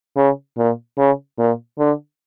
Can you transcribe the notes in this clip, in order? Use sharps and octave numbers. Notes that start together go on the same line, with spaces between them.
C#3
A#2
C#3
A#2
D3